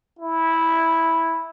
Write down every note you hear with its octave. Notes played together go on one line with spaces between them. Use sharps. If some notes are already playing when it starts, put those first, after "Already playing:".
E4